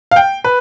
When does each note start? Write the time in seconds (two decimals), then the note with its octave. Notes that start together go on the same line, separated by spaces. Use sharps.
0.11 F5
0.16 G5
0.44 B4